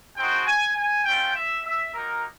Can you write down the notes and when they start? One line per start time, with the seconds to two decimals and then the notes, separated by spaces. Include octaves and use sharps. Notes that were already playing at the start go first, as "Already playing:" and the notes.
0.17 G#3 C4 D#4 F#4 G5
0.46 G#5
0.76 G#5
1.05 A3 C#4 F4 G5
1.35 E5
1.64 E5
1.94 A#3 D#4 F#4 A#4